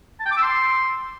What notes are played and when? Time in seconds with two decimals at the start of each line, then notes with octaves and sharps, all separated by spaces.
0.20 A5
0.25 G5
0.31 D6
0.37 E6
0.42 C6